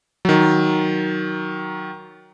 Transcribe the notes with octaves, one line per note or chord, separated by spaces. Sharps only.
D#3 F#3